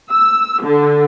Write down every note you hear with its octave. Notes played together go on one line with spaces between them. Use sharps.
E6
D3